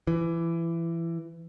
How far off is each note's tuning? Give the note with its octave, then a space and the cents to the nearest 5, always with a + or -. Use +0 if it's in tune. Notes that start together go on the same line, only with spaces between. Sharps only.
E3 +20